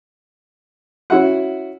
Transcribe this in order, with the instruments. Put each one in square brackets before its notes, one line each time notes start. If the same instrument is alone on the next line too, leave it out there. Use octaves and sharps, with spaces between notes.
[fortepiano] C#4 E4 F#4 E5 F#5